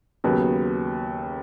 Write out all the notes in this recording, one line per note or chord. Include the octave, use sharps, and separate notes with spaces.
D#2 C#3 F#3 B3